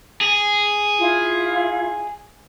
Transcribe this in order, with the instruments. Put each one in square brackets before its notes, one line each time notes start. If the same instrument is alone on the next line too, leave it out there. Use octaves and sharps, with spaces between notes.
[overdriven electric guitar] G#4
[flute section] E4 F4 F5